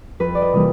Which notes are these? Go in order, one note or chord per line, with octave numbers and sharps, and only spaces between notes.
F2 B4
D5
D#5
C3 E3 G3 A#3